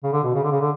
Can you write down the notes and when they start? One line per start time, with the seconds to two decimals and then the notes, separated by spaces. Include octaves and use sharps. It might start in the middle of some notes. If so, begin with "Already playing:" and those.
0.03 C#3
0.13 D3
0.23 B2
0.34 C#3
0.43 D3
0.51 C#3
0.60 D3